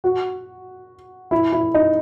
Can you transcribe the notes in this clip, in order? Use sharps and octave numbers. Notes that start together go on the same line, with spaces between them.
F#4
E4
E4
D#4